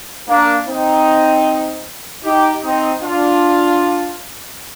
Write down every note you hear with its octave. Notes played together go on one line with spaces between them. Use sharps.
A#3 D4
C4 D#4
D#4 G4
C4 D#4
D4 F4